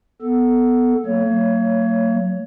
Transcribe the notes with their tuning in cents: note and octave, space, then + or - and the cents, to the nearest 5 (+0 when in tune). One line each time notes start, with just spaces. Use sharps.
B3 +0 A4 +0
F#3 +0 A#3 -45 C#5 +15